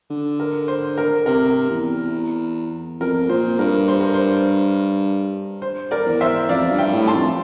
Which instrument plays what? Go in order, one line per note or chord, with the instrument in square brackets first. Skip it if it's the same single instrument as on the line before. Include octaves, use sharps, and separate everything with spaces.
[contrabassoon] D3
[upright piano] A#4
C5
A#4
[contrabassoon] C3 [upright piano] A#4
[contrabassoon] E2
[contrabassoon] F2 [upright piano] A#4
[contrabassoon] A#2 [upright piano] C5
[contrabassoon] G2 [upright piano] A#4
[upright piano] C5
A#4
C5
C5
A#4 D5
[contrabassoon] E2
[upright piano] C5 E5
[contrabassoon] F2 [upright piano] D5 F5
[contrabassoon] G2
[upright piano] E5 G5
[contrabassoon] A2
[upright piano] A5 C6
[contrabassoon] F2